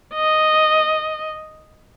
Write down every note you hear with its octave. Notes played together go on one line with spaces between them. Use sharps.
D#5